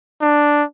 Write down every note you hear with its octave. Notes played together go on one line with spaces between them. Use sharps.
D4